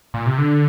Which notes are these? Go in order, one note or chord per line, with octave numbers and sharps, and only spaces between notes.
A#2
C3
D3